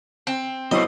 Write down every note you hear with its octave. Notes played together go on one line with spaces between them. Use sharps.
C4
F#3 B3 E4 F#4 C5 D#5